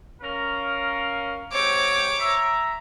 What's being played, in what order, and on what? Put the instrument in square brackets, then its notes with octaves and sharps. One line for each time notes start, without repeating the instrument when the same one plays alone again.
[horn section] C#4 A#4 F5
[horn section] G#2 C4 G4 [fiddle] C#5 D6
[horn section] E5 A#5